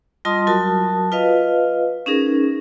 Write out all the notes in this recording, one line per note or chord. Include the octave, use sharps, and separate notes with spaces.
G3 F4 D#5 A5 C6 D#6
F#3 F#4 A#4 A5 D#6
F4 B4 D#5 F5
C#4 D#4 G#4 A#4